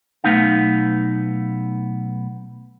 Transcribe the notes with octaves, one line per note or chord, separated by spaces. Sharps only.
B1 A#2 A3 B3 D#4 F5